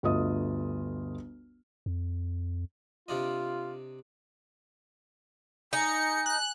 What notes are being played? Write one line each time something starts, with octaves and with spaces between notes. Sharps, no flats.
G1 D2 F4 D#5 D#6
F2
C3 D4 F4 D#5
D#4 G#5 C#7
F#6